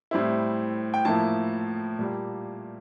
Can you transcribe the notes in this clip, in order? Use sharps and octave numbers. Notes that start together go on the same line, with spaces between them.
A2 G3 C4 E4
G5
A2 F3 A#3 E4 A5
A#2 G3 A#3